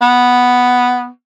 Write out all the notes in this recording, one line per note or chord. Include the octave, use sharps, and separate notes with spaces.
B3